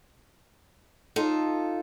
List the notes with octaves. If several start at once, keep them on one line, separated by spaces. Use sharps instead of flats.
D#4 F4 A4